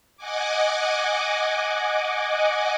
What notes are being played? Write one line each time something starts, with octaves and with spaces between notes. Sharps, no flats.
D#5 F#5 G#5 D6